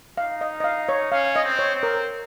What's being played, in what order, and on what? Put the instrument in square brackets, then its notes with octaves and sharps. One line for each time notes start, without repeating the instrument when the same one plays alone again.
[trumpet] D#4 [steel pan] F5
[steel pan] D#5
D#5
F5
C#5
[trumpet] C#4 [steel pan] F5
[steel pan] D#5
[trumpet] C4
[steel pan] C#5
[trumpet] C4
[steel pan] A#4